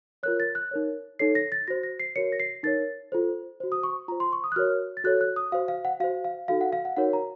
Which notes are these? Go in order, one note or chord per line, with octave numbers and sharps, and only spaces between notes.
F4 A#4 C#5 F#6
A6
F#6
D#4 A#4 C#5
D#4 A4 C#5 C7
A#6
A6
F#4 C5 A#6
A#6
C7
F#4 A#4 C#5 C#7
A#6
C7
D#4 A#4 C#5 A6
F4 A4 C5
F#4 C5
D#6
C#6
F4 C5 A#5
C6
C#6
D#6
F#6
F#4 A#4 C#5 F6
A6
F#4 A4 C#5 F#6
F#6
D#6
F#4 C5 F5
F5
F#5
F#4 C5 F5
F5
D#4 F#4 A4 F5
F#5
F5
F#5
D#4 F#4 A#4 C#5 F#5
A#5